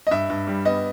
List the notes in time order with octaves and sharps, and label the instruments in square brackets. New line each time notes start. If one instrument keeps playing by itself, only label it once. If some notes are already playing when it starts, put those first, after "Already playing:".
[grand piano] D#5
G2 E5
G2
G3
B3 D#5